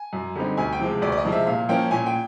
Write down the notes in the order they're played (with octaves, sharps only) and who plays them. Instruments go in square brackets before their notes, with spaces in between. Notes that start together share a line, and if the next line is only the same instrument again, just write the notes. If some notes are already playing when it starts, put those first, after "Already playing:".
Already playing: [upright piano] G#5
F#2
D3 G3 C4 D#4
D2 G#5
G5
C3 F3 G#3
D2 D5
D5
D#5
C3 F3 G#3
E5
A#2 F5
F3 A#3 C#4 G5
A#2 G#5
G5